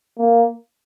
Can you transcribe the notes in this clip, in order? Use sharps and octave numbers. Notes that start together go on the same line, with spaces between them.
A#3